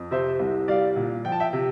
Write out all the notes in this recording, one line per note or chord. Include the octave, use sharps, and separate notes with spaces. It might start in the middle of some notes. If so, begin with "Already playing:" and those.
Already playing: F2
C3 C5 E5
C2
G3 D5 F5
A#2
F3 G5
A5
E5 G5
C3